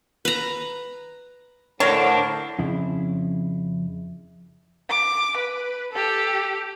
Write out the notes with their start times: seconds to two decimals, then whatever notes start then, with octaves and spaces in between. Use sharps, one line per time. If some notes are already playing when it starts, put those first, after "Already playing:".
0.25 B4 A#5
1.80 A2 D3 D4 A#4 C5 C#5
2.59 F2 C#3 E4
4.90 D6
5.37 B4
5.92 G4 A4